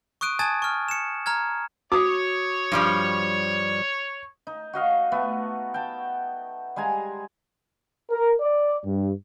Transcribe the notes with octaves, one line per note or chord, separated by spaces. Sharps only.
C#6 D#6 F#6 D7 D#7
G#5 A5 D#6 G#6 A6
C#6 F6
C#7 E7
A#5 F6 G#6
F#4 C#5 D6 D#6
G2 F3 G3
D#4
F#4 D#5 F5 C#6
A3 B3
G5 A5
G3 G#3 G#5 A#5
A#4
D5
G2